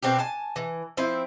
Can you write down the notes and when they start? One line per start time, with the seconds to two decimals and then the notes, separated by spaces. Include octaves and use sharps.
0.03 B2 C4 D4 G4
0.19 G#5 A5
0.56 E3
0.97 F3 C4 E4